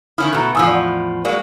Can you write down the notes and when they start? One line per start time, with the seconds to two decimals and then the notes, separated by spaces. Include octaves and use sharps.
0.18 D#3 C#4 E4 D#6 F6
0.33 B2 A3 A#5 F#6
0.55 E2 A2 F3 G#5 D#6 E6
0.67 D5 F#5
1.25 F#3 G#3 A#3 D5